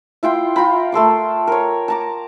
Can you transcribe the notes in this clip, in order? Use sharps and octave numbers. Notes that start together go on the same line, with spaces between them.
E4 F4 G5 C6
F4 G5 A#5 B5
A3 A4 C6 D6
A#4 C#5
A5 A#5 D6